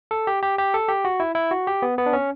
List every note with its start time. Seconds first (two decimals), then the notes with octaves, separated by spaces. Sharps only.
0.11 A4
0.27 G4
0.43 G4
0.58 G4
0.74 A4
0.88 G4
1.05 F#4
1.20 E4
1.35 E4
1.51 F#4
1.67 G4
1.82 B3
1.98 B3
2.06 D4
2.13 C#4